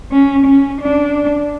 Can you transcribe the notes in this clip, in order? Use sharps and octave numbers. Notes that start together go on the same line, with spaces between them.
C#4
C#4
D4